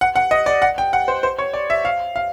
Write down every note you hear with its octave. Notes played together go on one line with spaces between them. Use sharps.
F#5
F#5
D#5
D5
F#5
G5
F#5
C5
C5
C#5
D5
E5
F5
F5